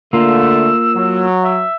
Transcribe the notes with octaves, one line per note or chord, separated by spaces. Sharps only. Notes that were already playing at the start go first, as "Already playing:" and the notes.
D3 A3 A#3 F4 E6
F#3
E5